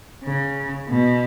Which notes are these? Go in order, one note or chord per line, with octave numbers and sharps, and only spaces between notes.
C#3
B2